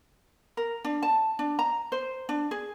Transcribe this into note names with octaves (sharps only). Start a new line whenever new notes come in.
A#4
D4
A5
D4
A#5
C5
D4
G#4